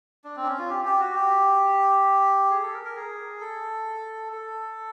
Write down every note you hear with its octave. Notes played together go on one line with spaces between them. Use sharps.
D4
C4
D4
C#4
F4
G4
G4
F#4
G4
G#4
A4
A#4
A#4
G#4
A4
A4